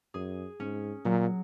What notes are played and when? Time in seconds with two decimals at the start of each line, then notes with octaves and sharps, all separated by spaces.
0.14 F#2 G#4
0.60 G#2 C#4
1.05 A#2 F#3